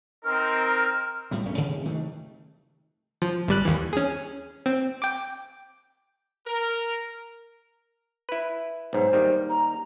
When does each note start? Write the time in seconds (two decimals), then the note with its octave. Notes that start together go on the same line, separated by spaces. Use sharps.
0.25 C4 D#4 A#4 F6
1.31 A2 G3 A3
1.46 E1 G2 A3 C#4
1.57 D2 C3 D#3
1.85 G2 D#3 A3
3.22 F3
3.48 G1 G3 F#6
3.65 D#2 E3
3.93 C#4 G#4
4.66 C4
5.02 G5 D6
6.47 A#4
8.29 E4 B4
8.93 B1 G#2 C5
9.13 D#2 D#3 G3
9.49 A#5